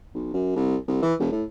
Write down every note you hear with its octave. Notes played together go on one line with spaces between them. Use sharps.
B1
F#2
C2
C2
E3
E1
A2